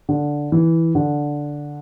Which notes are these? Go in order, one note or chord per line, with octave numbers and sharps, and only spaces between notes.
D3
E3
D3